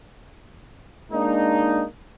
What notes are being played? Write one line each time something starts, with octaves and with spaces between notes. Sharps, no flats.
G#3 A#3 D4 D#4